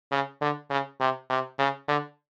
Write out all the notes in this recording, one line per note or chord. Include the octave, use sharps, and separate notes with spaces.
C#3
D3
C#3
C3
C3
C#3
D3